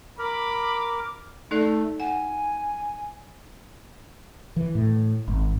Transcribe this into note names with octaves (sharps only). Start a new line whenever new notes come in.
A#4 B5 D6
A3 D#4 A4 D5
F#5 G#5
E3
A2
G#1